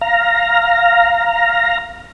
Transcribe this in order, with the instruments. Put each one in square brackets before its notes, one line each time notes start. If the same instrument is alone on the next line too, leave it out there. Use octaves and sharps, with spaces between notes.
[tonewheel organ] F5 A#5